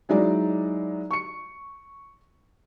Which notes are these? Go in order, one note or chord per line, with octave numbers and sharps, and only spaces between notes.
F#3 G#3 D#4 E4 D5
C#6 C#7